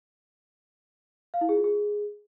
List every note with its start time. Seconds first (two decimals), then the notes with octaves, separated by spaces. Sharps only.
1.34 F5
1.41 E4
1.49 G#4
1.56 F4
1.64 G#4